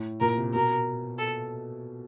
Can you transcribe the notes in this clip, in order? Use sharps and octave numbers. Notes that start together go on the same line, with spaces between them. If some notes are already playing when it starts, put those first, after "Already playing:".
Already playing: A2
A#2 A#4
C3
B2 A#4
A4